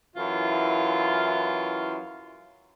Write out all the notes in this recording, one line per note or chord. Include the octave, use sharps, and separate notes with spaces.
F#2 E3 E4 F4